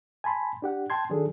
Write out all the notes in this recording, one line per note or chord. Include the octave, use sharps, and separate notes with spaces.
G#5 A5 B5 C6
D4 G4 F#5
G5 A5 C6 G#6
D#3 F#3 D4 F#4 G#4 A4